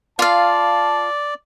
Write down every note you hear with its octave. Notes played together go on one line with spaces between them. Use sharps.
F4 D5 F5 A5